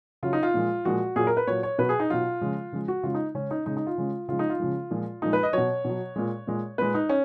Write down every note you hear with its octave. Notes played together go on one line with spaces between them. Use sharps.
C#3 F#3 F4
D#4
F4
A#2 F3 G#3
A#2 F3 G#3 F#4
A#2 F#3 G#4
A#4
B4
A#2 F#3 C#5
C#5
B2 F#3 B4
G#4
D#4
B2 F#3 F4
C#3 F3 G#3
C#3 F3 G#3
F#4
C#3 G#3 F4
D#4
C#3 G#3 C#4
D#4
C#3 G#3 D#4
D#4
F4
C#3 G#3
C#3 F3 G#3 F4
D#4
F4
C#3 F3 G#3
A#2 F3 G#3
A#2 F3 G#3 D#4
B4
D#5
B2 F#3 C#5
B2 F#3
A#2 G#3
A#2 G#3
A#2 G#3 B4
D#4
C#4